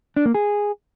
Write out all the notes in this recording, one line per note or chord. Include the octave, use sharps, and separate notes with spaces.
D4
A#3
G#4